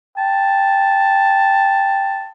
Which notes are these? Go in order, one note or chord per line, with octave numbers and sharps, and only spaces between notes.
G5 A5